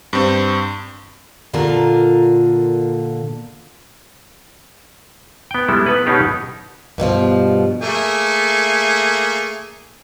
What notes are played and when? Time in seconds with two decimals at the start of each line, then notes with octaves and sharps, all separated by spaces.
0.13 G2 C4
1.53 A#2 D3 A#3 F4 A#4
5.51 B3 G5
5.69 G3 G#3 E4 A4
5.86 B3 B4
6.06 B2 B3 C#4 D#4 G4 G#4
6.98 G2 B2 D3 F3
7.81 A3 A#3 G#4